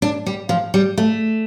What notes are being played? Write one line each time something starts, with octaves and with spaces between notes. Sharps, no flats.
D4
G3
F3
G3
A3